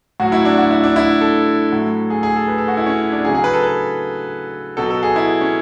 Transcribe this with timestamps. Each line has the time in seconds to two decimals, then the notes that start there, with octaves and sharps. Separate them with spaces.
0.20 A2 F#3 F#4
0.32 E4
0.45 D4
0.57 F#4
0.71 E4
0.84 D4
0.96 E4
1.21 A4
1.72 A2 F#3
2.10 G#4
2.23 G#4
2.36 A4
2.48 B4
2.58 A4
2.68 F#4
2.77 E4
2.86 C#4
3.12 D4
3.25 C#3 F#3 G#4
3.35 G#4
3.44 B4
3.54 A4
3.63 B4
4.77 B2 F#3 A4
4.91 A4
5.03 G#4
5.16 E4
5.41 C#4